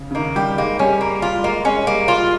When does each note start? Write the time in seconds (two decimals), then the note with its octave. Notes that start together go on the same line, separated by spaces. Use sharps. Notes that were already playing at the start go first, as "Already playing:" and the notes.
Already playing: C#3
0.11 C#3
0.15 D#3 A#3
0.36 G3 G4
0.58 G#3 A#3
0.79 G3 C#4
1.01 A#3
1.22 F4
1.38 G3
1.43 G#3 A#3
1.65 G#3 C#4
1.86 G3 A#3
2.08 F4